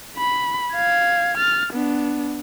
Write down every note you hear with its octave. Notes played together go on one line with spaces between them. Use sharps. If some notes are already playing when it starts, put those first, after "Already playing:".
B5
F5 G#6
F6 A6
B3 D4